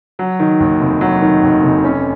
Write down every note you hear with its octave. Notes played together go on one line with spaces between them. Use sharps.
F#3
D#3
D#2
F1
F#3
D#3
D#2
F1
C#4